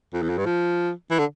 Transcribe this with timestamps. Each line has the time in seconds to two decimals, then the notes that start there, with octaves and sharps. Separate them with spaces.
0.14 F2
0.22 E2
0.30 F2
0.38 G2
0.46 F3
1.11 E3
1.19 D3